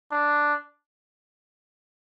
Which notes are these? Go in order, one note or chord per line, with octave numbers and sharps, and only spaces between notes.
D4